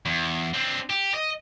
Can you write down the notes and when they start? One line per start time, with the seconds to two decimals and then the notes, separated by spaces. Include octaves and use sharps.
0.06 E2
0.54 C4 D4
0.90 G4
1.14 D#5